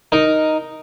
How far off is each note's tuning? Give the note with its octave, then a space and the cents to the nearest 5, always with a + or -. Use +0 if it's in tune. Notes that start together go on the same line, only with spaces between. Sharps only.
D#4 +0 A#4 +0